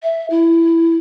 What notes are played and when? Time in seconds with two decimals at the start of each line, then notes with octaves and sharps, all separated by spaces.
0.03 E5
0.30 E4